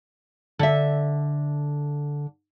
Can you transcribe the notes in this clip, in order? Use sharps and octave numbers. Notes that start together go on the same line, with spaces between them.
D3 E5